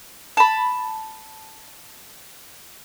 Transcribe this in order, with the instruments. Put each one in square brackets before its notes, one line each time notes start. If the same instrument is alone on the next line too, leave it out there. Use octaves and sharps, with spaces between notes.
[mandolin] A5 B5